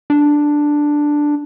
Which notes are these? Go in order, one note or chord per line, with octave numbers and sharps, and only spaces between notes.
D4